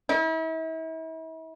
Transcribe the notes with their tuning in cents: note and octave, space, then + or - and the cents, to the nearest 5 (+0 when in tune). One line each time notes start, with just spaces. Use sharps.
E4 -40